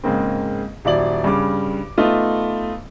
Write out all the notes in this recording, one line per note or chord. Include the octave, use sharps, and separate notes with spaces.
G#2 C#3 A#3 C4
D#1 F#3 E4 D5 F#7
G2 C#3 D6
A3 B3 D#4 F4